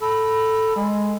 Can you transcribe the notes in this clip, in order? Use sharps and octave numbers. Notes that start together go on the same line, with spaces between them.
A4 B5
G#3